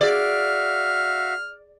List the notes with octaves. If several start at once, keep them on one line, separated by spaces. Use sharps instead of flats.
F#4 G#4 D5 E5 F5 F6